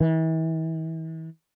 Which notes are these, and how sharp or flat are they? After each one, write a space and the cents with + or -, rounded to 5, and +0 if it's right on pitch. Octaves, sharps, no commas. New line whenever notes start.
E3 -40